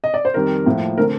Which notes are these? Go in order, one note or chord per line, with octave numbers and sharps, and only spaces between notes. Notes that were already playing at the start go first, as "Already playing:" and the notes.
D#5
D5
C5
F2 D#3 G3 A#4
A2 F3 A#3 F4
D3 A3 C4 A#4